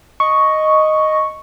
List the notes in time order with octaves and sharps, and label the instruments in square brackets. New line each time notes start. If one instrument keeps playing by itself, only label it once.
[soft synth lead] D#5 [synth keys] C#6